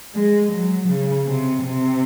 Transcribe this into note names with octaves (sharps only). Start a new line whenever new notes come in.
G#3
F#3
C#3
C3
C3